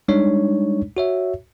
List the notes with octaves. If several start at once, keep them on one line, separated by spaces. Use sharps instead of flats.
G3 G#3 D4 D#4 C#5
F#4 C#5 E5